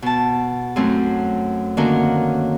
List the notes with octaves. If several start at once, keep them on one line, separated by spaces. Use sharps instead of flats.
B2 A5
F#2 F#3 A3 C4
D3 D#3 A#3 C#4 F#4 A#4